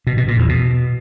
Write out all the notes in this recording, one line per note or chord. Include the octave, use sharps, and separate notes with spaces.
B2
B2
A#2
E2
B2